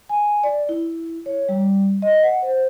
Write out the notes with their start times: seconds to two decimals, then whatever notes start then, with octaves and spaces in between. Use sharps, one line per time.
0.09 G#5
0.43 D5
0.69 E4
1.26 C#5
1.49 G3
2.02 D#5
2.23 F#5
2.42 C5